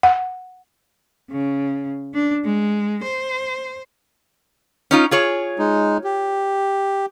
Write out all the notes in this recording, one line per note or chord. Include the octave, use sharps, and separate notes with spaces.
F#5
C#3
D4
G#3
C5
C#4 D#4 F4
F4 G#4 C#5
G#3 D#4
G4